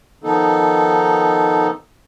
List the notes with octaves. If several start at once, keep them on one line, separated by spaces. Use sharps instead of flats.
D#3 F3 B3 D#4 A4